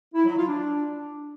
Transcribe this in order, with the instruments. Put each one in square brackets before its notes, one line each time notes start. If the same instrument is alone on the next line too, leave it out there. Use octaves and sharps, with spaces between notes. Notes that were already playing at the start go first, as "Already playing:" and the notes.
[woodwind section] E4
F#3
F4
D4